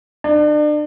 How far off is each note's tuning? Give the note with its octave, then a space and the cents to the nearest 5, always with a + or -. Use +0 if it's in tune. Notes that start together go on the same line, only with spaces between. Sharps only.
D4 +35